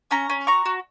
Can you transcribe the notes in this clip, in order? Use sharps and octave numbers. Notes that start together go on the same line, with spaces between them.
C#4 A#5 C#6
C#4
F#4 A#5 C#6
F#4